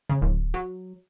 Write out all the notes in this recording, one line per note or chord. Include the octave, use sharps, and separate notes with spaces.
C#3
D1
F#3